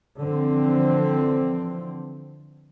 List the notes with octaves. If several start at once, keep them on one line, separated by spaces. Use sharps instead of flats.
D3 E3 F3 C4